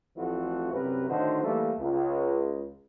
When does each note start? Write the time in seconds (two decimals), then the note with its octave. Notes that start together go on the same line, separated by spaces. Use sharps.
0.16 A1 E3 F3 A3 C4 F#4
0.72 C2 F#2 C3 A#4 B4
1.08 A2 D3 D#3 D#4 F#4 C5
1.42 E3 G3 A3 A#3
1.78 C#2